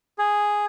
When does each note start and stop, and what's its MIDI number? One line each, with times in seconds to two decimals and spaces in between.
0.18 0.66 68